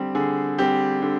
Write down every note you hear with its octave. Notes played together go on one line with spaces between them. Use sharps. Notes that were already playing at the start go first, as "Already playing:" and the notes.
Already playing: D3 G3 C4 G4
D3 G#4
G3 C4 G4
D3